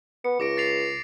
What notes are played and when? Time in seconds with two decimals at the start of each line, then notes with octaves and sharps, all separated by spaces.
0.24 B3 C#7
0.40 C#2 D6 A#6 D7
0.57 A6 C7 F7